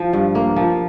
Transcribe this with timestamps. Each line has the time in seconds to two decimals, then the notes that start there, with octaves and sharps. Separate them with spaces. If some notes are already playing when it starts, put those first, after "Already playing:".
Already playing: F3
0.13 G2
0.35 A#3
0.56 F3